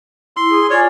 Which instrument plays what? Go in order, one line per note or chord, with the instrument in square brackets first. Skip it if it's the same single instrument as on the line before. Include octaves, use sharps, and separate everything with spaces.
[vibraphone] E4 [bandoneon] C6
[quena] G#4
[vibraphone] F4 G#5 [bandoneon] C#5 [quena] D5